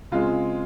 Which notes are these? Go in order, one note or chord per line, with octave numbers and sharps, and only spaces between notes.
C#3 G#3 C4 F4